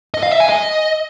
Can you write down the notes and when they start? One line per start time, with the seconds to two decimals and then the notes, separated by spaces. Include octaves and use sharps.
0.14 D#5
0.23 F5
0.32 E5
0.40 G#5
0.49 D#5